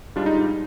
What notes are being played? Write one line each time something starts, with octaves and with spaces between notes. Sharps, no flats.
G#2 G3 D4 F4
D#4